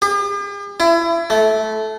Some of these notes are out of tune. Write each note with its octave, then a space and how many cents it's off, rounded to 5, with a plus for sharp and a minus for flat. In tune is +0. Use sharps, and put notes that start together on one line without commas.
G4 +45
E4 +30
A3 -15